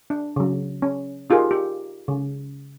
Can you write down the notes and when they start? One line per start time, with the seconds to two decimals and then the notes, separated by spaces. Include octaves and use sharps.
0.10 D4
0.36 C#3 F#3
0.82 C#4
1.30 D#4 F4 G4 G#4 A#4
1.51 G4
2.08 C#3